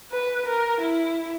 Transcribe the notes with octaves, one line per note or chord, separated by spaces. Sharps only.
B4
A#4
E4